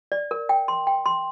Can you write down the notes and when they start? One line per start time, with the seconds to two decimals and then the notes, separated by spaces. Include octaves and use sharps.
0.12 D5
0.31 A#4
0.49 G5
0.68 C6
0.87 G5
1.06 C6